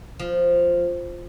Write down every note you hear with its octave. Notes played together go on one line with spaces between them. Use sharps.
F3